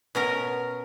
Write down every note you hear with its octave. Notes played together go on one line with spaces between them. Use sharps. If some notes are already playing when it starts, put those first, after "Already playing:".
B2 C#4 A#4